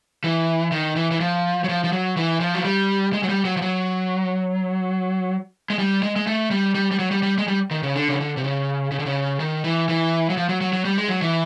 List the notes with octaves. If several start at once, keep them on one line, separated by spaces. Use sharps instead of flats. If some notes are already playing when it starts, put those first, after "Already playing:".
E3
D#3
E3
E3
F3
F#3
F3
F3
F#3
E3
F3
F#3
G3
G#3
F#3
G3
F#3
F3
F#3
G#3
G3
G#3
G#3
A3
G3
G3
G3
F#3
G3
G3
G#3
G3
D#3
C#3
D3
C#3
D3
C3
C#3
C#3
D3
C#3
D#3
E3
E3
F#3
F3
F#3
F#3
F#3
G3
G#3
F#3
E3